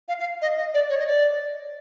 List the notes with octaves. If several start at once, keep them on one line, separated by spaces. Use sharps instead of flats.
F5
F5
D#5
D#5
D5
C#5
D#5
D5